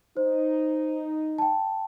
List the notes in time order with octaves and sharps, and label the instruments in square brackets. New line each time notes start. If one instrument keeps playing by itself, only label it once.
[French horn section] D#4 [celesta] C5
[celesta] G5 A5